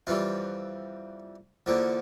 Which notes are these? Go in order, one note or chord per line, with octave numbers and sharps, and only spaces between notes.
F2 E3 G3 F4
E2 D3 F3 A#3